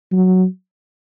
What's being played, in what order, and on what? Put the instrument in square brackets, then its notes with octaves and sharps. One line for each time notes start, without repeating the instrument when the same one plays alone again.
[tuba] F#3